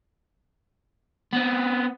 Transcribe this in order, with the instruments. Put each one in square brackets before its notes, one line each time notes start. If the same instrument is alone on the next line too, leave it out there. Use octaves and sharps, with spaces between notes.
[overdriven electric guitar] B3 C4